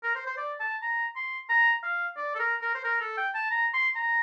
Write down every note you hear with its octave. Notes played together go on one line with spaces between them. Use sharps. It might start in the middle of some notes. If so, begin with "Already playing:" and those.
A#4
C5
C5
D5
A5
A#5
C6
A#5
F5
D5
A4
A#4
A#4
C5
A#4
A4
G5
A5
A#5
C6
A#5